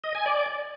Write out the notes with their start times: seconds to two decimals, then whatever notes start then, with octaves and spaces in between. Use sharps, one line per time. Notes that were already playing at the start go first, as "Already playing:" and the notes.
0.04 D#5
0.15 G#5
0.26 D5